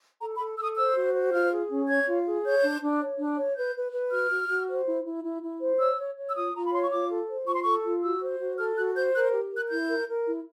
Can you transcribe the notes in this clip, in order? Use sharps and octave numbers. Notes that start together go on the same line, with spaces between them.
A4 A#5
B5
A4
A4 E6
D#6
C5 E6
F#4
C5
F4 F6
G#4
C#4
C#5 G#6
F4
G#4
C#5 G6
D4
D4
C#5
D4
C#5
B4 G6
B4
B4
F#4 F6
F#4
F#4
C5
E4
E4
E4
E4
C5
C#5 E6
C#5
C#5
E6
F4 D#6
F4 A#5
B5
C#5 C6
C#6
F4 D6
A4
C5
F4 C#6
C6
A4 C#6
F4
F#4 E6
C5
F#4
A4 F6
F#4 F#6
C5 G6
A#4 F#6
G4
A#4 F#6
E4 G6
A#4
A#4
E4